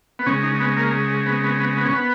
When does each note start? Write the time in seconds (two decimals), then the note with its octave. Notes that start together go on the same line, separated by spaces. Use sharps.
0.19 B3
0.26 C#3 G#3 C#4
0.43 D#4
0.60 B3
0.77 A#3
1.26 B3
1.44 B3
1.60 B3
1.77 B3
1.85 C#4
1.93 B3